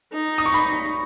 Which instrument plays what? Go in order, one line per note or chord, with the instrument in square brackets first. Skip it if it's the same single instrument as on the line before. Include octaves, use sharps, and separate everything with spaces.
[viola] D#4
[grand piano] D#6
C#6
B5